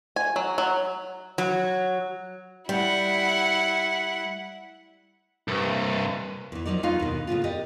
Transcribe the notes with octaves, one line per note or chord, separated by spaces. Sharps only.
G#5
F#3
F#3
F#3
G3 E4 F#5
C2 G2
E2 E3
F3 F#3 D#4 A#4 D5
A3 B3 D#4 F4 B4 F5
D#2 B2
A2 C#3 B3 F4
G4 A#4 D5 D#5